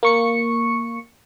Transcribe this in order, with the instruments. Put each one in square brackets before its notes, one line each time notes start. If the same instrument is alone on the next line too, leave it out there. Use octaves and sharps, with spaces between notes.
[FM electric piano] A#3 C#6 C#7